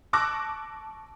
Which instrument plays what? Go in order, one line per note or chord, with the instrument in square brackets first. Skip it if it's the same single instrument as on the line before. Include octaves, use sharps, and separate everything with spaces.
[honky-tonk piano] A5 C#6 D6 E6 F#6 A#6